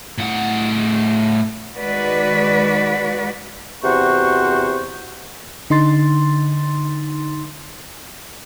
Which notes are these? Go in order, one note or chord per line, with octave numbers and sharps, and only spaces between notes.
A2 F#5
D#3 G#3 F#4 B4 D5
E2 C3 F#4 C5 F#5 C#6
D3 D#4 C6 A6